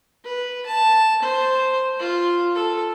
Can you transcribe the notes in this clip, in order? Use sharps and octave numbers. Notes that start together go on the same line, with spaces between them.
B4
A5
C5
F4
A4